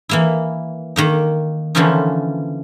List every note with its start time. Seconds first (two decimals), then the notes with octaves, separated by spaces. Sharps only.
0.09 E3 A#3 E4
0.96 D#3 A#3 D#4
1.75 D3 E3 F3 A#3 C#4 D#4